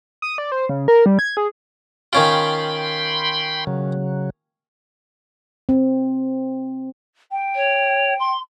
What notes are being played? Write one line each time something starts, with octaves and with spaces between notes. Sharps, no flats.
D#6
D5
C5
C#3
A#4
G3
G#6
G#4
D#3 C#4 F4 G5 B5 C6
C#3 F#3
C4
G5
C#5
C6